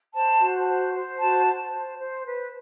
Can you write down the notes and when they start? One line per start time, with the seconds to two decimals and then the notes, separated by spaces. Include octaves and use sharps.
0.14 C5 A5
0.41 F#4
0.68 C5
0.94 C5
1.20 F#4 A5
1.47 C5
1.73 C5
1.99 C5
2.25 B4